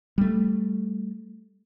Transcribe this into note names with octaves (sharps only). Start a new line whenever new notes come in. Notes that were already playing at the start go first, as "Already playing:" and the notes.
G3 A3